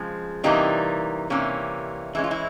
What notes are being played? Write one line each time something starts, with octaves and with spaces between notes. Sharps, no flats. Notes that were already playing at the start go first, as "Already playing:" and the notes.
Already playing: C#3 F3 G#3 C4
C3 E3 G3 A#3 C#4 D#4
C3 E3 G3 A#3 C#4
E3 G#3 C#4 E4
F4
E4